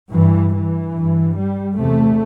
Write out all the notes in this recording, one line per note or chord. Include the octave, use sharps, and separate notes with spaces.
G2 E3
E3
G2
G3
E2 C3 A3